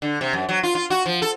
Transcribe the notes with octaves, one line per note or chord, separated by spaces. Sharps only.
D3
C3
F#2
F#3
F4
F4
F#4
F3
A4